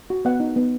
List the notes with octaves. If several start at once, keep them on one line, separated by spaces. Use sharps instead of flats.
F#4
B3 F#5
D#4
B3